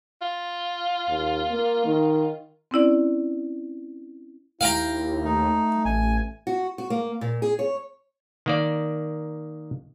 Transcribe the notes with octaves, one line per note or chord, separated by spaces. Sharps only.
F4
D#2
A#3
D#3
C4 C#4 E4 D5
D#2 E4 F5 G5 A#5
A3 D#4
A1 G#5
F#4
F#4
A#3
A#2
G#4
C#5
D#3 A#3 D5